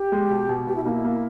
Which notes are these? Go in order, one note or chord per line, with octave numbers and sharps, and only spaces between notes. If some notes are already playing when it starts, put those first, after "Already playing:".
Already playing: G4
G#3
B2
B2
B2 G4
E4
A#3 D#4
E4
A#3